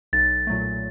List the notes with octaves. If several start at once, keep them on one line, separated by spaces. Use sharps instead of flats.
B1 A6
A#2 F#3 A3